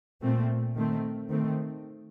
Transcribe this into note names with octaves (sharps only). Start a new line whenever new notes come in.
A#2 A3 C4
D#3 A3 C4
D#3 A3 C4